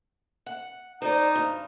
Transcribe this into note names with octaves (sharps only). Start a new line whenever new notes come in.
F#5
D#4 C5 D5
G2